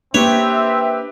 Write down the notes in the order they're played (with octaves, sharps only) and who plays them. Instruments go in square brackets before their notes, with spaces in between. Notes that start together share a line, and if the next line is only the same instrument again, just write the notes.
[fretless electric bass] A#3 D4 [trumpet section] C4 E5 [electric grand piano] G4 B4 [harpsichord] C#5